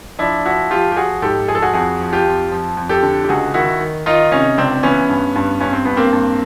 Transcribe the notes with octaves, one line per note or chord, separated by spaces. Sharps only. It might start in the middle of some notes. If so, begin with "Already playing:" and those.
F3 D4 E4
F3 E4 F#4
F3 F4 G4
G4
F3 F#4 G#4
G#2 G4 A4
F3 G#4
A4
F#4 G#4
F2 F#4 G#4
F3
F4 G4
F2
F3
F2
G4 A4
D3
G4
C#2 F#4 G#4
D#3 E4 F#4
D#3
D#3 D#4 F4
C3 C#4 D#4
C#2 C4 D4
E3 B3 C#4
G2
G2
G2 C#4
C4
G2 B3
A#3 C4
G2